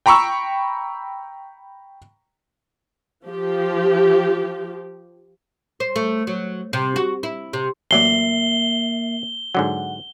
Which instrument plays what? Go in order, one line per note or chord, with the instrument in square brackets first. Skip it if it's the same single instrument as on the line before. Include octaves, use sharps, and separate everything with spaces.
[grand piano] G5 A#5 B5 C#6 E6
[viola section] F3 G4
[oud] C5
A3
F#3
C3
F#4
E4
C3
[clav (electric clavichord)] A1 F#3 D5 [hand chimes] A#3 E5 C7 [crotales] G7
[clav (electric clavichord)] G#2 D3 F#3 [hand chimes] F#5